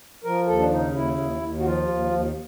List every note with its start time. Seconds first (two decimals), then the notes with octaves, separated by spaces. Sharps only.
0.24 F3 A#4
0.47 D#2 A4
0.60 D4
0.71 C#3 D#4
0.94 D#2 E4
1.19 D#2
1.41 D#2
1.60 F#4
1.65 F3 F4
1.88 D#2
2.12 D#2